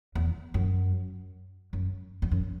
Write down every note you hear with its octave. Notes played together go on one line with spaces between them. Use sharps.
E2
F#2
F#2
E2
F#2